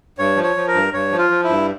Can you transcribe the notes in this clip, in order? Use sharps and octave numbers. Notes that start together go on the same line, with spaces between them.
G2 C#5
F3
C#5
F3
A#4
G2
G2 C#5
F3
F4
F3
E4
G2